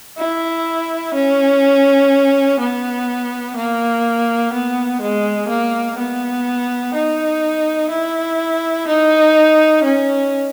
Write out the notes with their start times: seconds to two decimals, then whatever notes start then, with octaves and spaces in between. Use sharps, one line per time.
0.18 E4
1.15 C#4
2.60 B3
3.57 A#3
4.53 B3
5.02 G#3
5.49 A#3
5.98 B3
6.94 D#4
7.91 E4
8.88 D#4
9.84 C#4